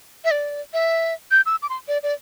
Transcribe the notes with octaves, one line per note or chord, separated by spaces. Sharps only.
E5
D5
E5
G6
E6
D6
C6
D5
D5